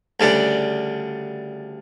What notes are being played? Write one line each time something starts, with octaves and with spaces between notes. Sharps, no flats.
D2 C#3 G3 D4